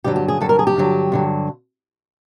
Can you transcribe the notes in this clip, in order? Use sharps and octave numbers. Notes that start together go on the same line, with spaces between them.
G2 D3 F#3 G4
G4
G#4
G2 D3 F#3 A4
A#4
G#4
G4
G2 D3 F#3
G2 D3 F#3